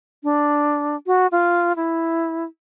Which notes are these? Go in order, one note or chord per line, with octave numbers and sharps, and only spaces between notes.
D4
F#4
F4
E4